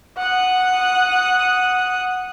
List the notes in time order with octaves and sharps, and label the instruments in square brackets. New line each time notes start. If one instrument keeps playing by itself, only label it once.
[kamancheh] F#5 D#6